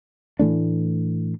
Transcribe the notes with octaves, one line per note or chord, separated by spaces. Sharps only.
A2 E3 A3 D4